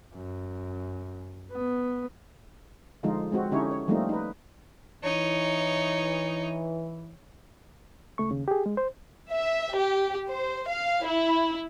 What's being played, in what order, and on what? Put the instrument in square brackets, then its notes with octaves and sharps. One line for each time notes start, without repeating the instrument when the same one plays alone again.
[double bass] F#2
B3
[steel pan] D3 F3 G#3 D#4 F4
G#3 C4 F#4
D3 C#4 D#4 E4 G4 C#5
C#5
F3 G3 A3 A#3 C4 D#4
D#4 B4
[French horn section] E3 [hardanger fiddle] D#4 C#5
[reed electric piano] C#2 A3 C#6
D#2 C#3
G4 G#4
G#3
C5
[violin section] E5
G4
C5
F5
E4